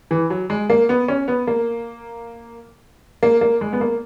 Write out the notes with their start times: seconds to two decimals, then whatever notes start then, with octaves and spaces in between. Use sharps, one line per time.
0.11 E3
0.30 F#3
0.50 G#3
0.70 A#3
0.89 B3
1.08 C#4
1.28 B3
1.47 A#3
3.23 A#3
3.41 A#3
3.61 G#3
3.73 B3
3.81 A#3